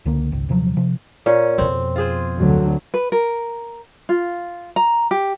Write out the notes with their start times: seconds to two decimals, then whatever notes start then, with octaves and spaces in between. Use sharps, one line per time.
0.06 C#2 D3 A#3
0.32 G#1 C#2
0.49 D#1 C3 F3 F#3
0.77 C3 F3
1.26 A#2 C#4
1.58 F2 B2 C4
1.96 F4 G#4 C5
2.39 D2 D3 F#3
2.94 B4
3.12 A#4
4.09 F4
4.76 A#5
5.11 G4